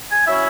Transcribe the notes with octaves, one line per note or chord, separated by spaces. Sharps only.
G#5
F#3 C#4 E4 E5